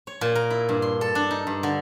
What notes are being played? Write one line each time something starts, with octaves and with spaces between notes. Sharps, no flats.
C#5
A#2
A#4
E4
G2
C6
A4
D4
D#4
G2
D3